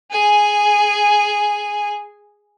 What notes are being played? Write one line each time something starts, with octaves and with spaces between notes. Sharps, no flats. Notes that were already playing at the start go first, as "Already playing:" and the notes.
G#4 G#5